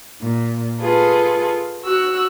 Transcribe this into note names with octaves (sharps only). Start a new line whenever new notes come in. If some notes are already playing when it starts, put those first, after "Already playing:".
A#2
F4 G#4 A4 B4
F#4 E6 F#6